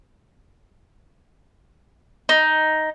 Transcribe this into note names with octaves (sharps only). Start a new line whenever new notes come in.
D#4